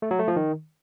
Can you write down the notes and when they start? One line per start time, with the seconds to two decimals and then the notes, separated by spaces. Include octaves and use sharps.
0.02 A3
0.11 F#3
0.19 A3
0.28 F3
0.36 D#3